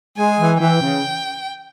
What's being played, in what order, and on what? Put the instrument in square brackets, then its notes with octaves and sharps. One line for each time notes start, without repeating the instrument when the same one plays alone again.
[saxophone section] G#3 [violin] G#5
[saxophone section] E3
[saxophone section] E3 [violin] G5
[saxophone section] C#3